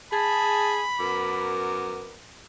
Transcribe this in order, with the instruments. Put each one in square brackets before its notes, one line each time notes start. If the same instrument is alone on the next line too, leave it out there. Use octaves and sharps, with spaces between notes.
[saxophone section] G#4 [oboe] A5 [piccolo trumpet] B5
[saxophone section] F#2 B3 A#4 [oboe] D6